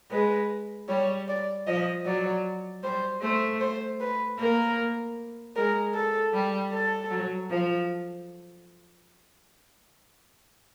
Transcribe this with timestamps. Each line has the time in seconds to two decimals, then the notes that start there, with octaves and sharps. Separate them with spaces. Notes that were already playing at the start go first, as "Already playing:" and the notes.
0.11 G#3 B4
0.89 G3 C#5
1.28 D5
1.67 F3 D#5
2.05 F#3 D5
2.83 G3 C5
3.22 A3 C5
3.61 C5
4.00 B4
4.38 A#3 A#4
5.56 G#3 A#4
5.94 A4
6.33 G3
6.72 A4
7.11 F#3
7.50 F3